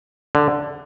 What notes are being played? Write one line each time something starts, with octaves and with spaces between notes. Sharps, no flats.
D3